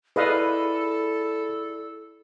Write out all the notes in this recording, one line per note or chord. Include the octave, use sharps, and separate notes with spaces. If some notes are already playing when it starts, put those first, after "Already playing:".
E4 G#4 A4 B4 D5 D#5 F5 B5